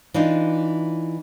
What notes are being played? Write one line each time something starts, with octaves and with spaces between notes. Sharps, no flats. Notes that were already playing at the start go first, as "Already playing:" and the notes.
E3 D4 D#4 F4